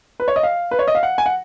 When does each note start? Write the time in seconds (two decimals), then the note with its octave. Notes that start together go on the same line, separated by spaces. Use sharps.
0.20 B4
0.28 C#5
0.36 D#5
0.43 F5
0.71 B4
0.79 C#5
0.87 D#5
0.95 F5
1.03 F#5
1.18 G#5
1.26 F#5